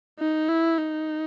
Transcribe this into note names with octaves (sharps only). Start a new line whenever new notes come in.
D#4
E4
D#4